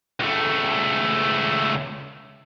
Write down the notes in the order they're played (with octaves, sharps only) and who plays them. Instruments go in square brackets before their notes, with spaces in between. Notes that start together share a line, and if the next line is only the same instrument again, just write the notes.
[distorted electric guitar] C#2 A3